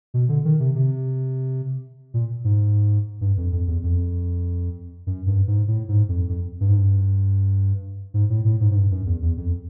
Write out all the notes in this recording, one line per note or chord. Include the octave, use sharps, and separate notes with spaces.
B2
D3
D#3
C3
C3
A#2
G#2
G2
F2
F2
E2
F2
F#2
G2
G#2
A2
G#2
F2
F2
G2
G#2
G2
G#2
A2
A2
G#2
G#2
G2
F#2
E2
E2
F2